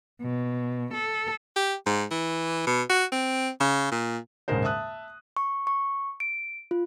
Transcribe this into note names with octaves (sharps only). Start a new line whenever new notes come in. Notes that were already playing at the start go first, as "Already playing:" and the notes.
B2
A4
G4
G#2
E3
B2
F#4
C4
C#3
A#2
D#1 G#2 C#3 G#3 A#4 C5
E5 A5 D#6 F#6
C#6
C#6
D7
F4